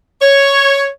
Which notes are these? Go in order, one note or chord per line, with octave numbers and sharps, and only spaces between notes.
C#5